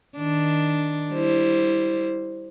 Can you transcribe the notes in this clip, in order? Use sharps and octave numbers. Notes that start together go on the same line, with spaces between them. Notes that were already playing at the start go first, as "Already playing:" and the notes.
D#3 D4
G3 E4 C5